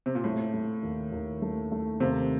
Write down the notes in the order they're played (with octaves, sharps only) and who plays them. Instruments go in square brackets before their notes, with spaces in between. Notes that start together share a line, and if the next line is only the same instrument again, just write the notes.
[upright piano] C3
A#2
[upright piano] A2 [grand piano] A3
[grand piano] A3
D#2
D#2
A3
A3
[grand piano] D#2 [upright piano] C3